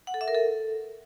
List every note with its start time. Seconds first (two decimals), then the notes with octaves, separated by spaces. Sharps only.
0.07 F#5
0.14 A4
0.21 E5
0.28 A#4
0.34 A4